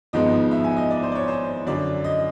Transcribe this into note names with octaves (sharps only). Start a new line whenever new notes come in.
G#1 G#2 F3 G#3 B3 D#5
E5
G#5
D#5
D5
C5
D5
C#5
C5
F#2 D3 F#3 D5
D#5